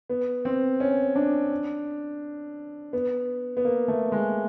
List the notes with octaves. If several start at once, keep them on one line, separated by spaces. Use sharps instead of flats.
B3
C4
C#4
D4
B3
B3
A#3
A3
G#3